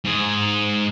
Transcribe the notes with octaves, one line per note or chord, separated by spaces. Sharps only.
G#2 G#4